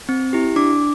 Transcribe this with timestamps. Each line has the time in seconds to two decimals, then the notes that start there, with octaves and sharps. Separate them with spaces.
0.09 C4
0.33 E4 G4
0.56 D4 D6